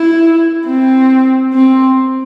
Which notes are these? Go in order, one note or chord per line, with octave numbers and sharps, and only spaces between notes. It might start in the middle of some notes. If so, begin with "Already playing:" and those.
Already playing: E4
C4
C4